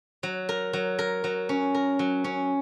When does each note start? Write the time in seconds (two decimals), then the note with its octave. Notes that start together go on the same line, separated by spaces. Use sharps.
0.23 F#3
0.49 A#4
0.73 F#3
0.99 A#4
1.24 F#3
1.49 C#4
1.74 A#4
1.99 F#3
2.24 C#4